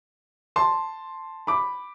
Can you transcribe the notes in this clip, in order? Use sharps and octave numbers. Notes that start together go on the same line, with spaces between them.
A5 C6
B5 D6